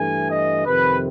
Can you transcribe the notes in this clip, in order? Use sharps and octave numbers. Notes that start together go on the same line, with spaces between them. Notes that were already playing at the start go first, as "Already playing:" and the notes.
Already playing: G2 E3 A3 G#5
D#5
F2 C3 D#3 B4